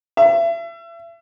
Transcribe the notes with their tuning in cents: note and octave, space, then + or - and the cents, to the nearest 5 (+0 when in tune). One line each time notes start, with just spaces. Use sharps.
E5 +35